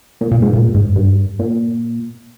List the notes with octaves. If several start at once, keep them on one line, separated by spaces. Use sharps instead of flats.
A#2
A#2
G#2
A#2
G#2
G2
A#2